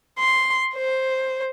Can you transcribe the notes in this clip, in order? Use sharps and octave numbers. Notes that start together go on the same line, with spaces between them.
C6
C5